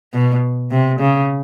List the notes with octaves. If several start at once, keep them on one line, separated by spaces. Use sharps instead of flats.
B2
C3
C#3